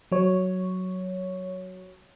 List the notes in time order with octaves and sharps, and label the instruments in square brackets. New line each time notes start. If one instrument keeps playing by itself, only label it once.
[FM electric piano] F#3 C#5